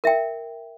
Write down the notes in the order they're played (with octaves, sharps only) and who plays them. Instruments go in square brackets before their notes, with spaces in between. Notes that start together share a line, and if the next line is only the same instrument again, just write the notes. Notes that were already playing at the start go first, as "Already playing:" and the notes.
[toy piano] A#4 E5 G5